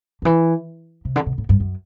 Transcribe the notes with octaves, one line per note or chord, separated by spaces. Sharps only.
D3
E3
C3
D3
C3
A2
G2
F#2